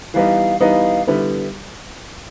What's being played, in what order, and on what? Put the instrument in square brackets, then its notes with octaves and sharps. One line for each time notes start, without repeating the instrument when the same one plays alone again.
[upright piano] E3 G3 B3 D#4 [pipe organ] F5
[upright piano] E3 G3 B3 D#4 [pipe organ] F5
[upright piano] D3 G3 B3 E4